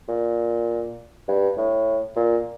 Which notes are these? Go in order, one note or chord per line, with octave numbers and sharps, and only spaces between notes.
A#2
G2
A2
A#2